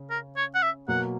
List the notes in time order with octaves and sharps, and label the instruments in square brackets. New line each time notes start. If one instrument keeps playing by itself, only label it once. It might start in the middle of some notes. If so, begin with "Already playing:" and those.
Already playing: [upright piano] C#3 C#4
[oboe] A#4
C#5
F#5
E5
[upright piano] B2 F#3 A#3 [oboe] F#5